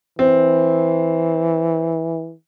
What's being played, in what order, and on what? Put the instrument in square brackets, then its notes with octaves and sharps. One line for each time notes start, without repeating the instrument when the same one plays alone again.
[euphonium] E3 [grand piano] C4